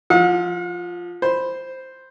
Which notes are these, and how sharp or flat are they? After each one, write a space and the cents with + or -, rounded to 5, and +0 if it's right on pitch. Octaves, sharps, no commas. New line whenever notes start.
F3 +0 F#5 -45 E6 -45
C5 +0 B5 +0